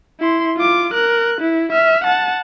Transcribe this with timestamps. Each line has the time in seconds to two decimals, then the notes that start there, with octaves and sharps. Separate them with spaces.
0.20 E4 C6
0.57 F4 D6
0.94 A#4 F#6
1.41 E4
1.72 E5 F6
2.04 F#5 A5